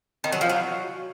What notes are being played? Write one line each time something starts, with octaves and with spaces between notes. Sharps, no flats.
D#3
F#3
F3
F#3